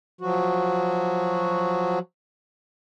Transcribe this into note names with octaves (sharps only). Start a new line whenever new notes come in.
F3 F#3 F#4